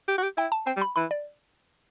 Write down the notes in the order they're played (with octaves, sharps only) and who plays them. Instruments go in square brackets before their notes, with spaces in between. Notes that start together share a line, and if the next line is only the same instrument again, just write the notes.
[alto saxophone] G4
F#4
G4
[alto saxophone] E4 [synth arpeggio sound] G5
[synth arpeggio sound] A5
[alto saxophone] C4 [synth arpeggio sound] G5
[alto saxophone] G3
[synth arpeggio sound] B5
[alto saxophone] E3 [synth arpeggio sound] B5
[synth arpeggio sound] D5